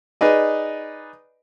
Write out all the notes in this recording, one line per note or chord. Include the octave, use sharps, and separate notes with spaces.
D#4 G#4 B4 D5 D#5